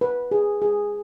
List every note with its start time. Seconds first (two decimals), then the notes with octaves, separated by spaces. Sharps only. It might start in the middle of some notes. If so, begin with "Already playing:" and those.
0.01 B4
0.31 G#4
0.62 G#4